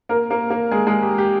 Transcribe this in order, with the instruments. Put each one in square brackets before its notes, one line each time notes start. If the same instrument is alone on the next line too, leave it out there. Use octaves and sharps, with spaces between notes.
[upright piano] A#3 A#4
A#3 A#4
A#3 A#4
G#3 G#4
G#3 G#4
G4
G4